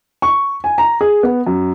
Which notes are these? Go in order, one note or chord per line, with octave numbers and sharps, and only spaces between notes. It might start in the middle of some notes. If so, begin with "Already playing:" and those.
C#6
G#5
A#5
G#4
B3
F#2